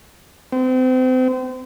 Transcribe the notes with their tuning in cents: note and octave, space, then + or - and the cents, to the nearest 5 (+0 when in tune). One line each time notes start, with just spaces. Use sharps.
C4 -35